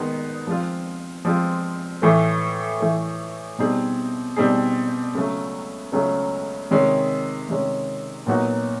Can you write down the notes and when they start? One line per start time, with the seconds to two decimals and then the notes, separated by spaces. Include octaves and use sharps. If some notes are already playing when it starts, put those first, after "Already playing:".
Already playing: D#3 G#3 B3 D#4
0.47 F3 G#3 C4 F4
1.25 F3 G#3 C4 F4
2.02 A2 E3 A3
2.80 A2 E3 A3
3.58 B2 G3 C4 D#4 G#4
4.36 B2 G3 C4 D#4 G#4
5.15 C#2 C#3 F#3 A3
5.92 C#2 C#3 F#3 A3
6.71 C3 D#3 G#3 C#4
7.49 C3 D#3 G#3 C#4
8.27 A#2 F#3 B3 D#4 F#4